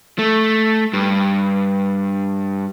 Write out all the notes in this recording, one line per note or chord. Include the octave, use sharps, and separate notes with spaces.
A3
G2